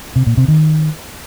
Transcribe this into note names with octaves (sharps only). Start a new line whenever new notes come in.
C3
A#2
C3
D#3